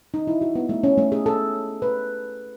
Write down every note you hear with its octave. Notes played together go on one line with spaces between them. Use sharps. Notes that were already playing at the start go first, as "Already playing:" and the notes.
D#4
E4
F#4
B3
A3
C#4
A3
G#4
A4
B4